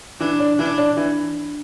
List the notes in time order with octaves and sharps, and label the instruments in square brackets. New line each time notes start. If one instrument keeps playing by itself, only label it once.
[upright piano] E3 [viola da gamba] D4
[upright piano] D4
[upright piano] E3 [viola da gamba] D4
[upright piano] D4
E3